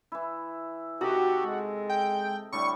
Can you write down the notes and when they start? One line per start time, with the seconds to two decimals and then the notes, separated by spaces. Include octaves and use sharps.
0.12 E3 E4
1.01 C3 D#4 F#4 G4 A4
1.46 G#3
1.89 G5
2.52 A2 D3 G3 C#6